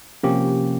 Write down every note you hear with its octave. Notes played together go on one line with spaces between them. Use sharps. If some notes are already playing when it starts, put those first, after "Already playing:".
C3 F3 A#3 C#4 G4